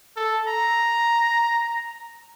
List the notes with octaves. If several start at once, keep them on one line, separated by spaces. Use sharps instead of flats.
A4
A#5